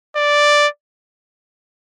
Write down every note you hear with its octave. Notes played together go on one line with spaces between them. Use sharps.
D5